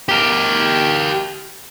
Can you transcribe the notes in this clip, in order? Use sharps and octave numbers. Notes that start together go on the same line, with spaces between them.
G4 A#4